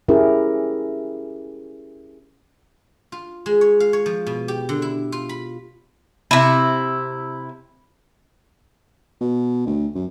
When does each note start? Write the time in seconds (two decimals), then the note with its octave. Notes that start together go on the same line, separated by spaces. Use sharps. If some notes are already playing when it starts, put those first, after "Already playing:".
0.08 C#4 E4 G4 G#4 A#4
3.12 F4
3.46 G#3
3.61 C#5
3.80 F5
3.93 C#5
4.06 F3
4.27 B2
4.48 G4
4.69 D3
4.82 E4
5.12 F4
5.29 B5
6.31 C3 E4
9.21 B2
9.67 D2
9.95 F#2